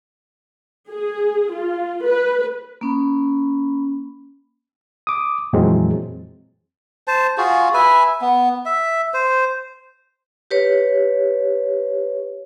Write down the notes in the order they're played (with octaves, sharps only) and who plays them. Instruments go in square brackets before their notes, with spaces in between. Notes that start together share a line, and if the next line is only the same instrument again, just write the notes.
[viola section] G#4
F4
B4
[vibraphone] A#3 C#4 B5
[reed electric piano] D6 D#6
F2 A#2 E3 F#3 G#3 C4
[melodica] C5 A5
F4 F#4 G#4
B4 E5 G#5
B3
E5
C5
[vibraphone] G4 B4 C#5